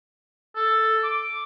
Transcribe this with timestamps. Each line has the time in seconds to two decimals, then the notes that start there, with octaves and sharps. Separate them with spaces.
0.56 A4
1.03 D6